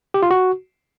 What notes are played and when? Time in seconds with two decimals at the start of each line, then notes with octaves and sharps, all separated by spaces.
0.14 G4
0.22 F4
0.31 F#4